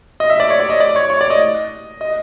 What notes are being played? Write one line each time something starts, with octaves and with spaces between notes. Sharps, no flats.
D#5
E5
D5
C#5
D5
D#5
D5
C#5
C#5
D5
D#5
D#5